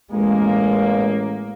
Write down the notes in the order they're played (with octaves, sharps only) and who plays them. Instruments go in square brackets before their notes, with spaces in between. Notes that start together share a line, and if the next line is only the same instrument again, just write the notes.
[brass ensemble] A1 A#3 [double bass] G#3